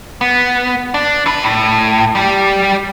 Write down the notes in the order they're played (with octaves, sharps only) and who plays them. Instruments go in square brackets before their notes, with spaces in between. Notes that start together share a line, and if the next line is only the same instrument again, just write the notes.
[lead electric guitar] B3
D4
E3 B4
A2
G3 G4